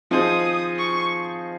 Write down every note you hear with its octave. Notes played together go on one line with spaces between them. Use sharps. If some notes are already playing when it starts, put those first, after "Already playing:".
F3 C4 D#4 G#4 C5 D#6
C#6